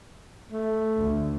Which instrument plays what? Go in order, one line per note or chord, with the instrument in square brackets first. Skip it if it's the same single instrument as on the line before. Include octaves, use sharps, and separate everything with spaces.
[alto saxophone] A3
[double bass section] D2